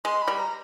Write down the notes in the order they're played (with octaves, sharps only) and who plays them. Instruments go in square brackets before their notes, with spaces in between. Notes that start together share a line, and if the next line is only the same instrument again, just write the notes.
[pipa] G#3 [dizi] C6
[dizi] B5
[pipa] G3
[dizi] A#5